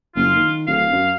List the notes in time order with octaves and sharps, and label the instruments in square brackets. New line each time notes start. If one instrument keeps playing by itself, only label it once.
[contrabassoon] F#1 [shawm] F4
[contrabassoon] D#3
[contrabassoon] D1 [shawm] F5
[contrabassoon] F#2